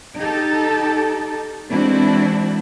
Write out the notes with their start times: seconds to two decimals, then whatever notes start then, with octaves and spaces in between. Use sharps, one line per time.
0.16 D#4 G4 A4
1.68 E3 G#3 C4 D4 E4 F#4